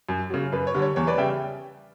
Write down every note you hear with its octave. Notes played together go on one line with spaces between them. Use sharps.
F#2
C#3 F#3
F#2 B4
C#5
D3 G3
C#5
E2 C#5
B4 D5
C#3 G3 E5 G5